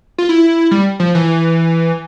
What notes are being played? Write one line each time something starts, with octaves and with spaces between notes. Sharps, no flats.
F4
E4
G3
F3
E3